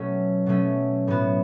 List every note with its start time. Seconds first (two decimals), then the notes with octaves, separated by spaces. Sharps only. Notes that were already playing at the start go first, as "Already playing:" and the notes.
Already playing: B2 F#3 A3 C#4
0.46 B2 F#3 A3 C#4
1.07 A2 F#3 B3 F#4